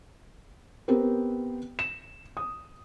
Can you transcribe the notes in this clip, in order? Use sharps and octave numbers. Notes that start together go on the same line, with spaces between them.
B3 C4 G4 A#4
E7
D#6